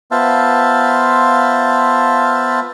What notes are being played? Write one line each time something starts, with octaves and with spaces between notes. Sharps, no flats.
B3 F4 C5 E5 F5 A5